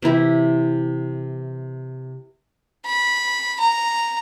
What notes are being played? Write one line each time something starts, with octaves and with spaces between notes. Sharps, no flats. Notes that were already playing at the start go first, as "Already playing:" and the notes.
C3 E3 E4 G4
B5
A#5